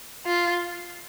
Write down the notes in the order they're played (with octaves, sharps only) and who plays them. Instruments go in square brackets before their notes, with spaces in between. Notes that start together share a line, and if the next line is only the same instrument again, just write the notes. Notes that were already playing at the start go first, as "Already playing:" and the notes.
[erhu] F4